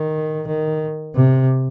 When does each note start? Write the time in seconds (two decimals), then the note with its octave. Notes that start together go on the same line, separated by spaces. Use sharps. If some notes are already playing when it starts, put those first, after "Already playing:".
Already playing: D#3
0.47 D#3
1.15 C3